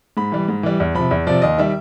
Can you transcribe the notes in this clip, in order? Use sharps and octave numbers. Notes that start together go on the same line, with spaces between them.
G#2 B5
E3 G3
G#2
E3 G3
E2
C3 F3 B5
E2
C3 F3 D5
D#2 D#5
D#3 G3 E5